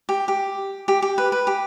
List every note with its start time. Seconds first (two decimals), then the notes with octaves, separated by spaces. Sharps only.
0.09 G4
0.28 G4
0.88 G4
1.02 G4
1.18 B4
1.32 B4
1.47 G4